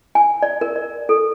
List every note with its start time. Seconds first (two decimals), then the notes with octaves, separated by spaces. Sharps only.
0.15 G#5
0.42 D5
0.61 A#4
0.76 D5
1.09 A4